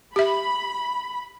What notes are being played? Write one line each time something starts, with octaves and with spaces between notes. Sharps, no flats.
G4 E5 B5